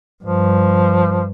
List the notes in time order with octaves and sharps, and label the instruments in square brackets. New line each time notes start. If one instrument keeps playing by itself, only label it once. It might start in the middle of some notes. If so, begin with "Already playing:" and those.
[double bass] G2 [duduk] F3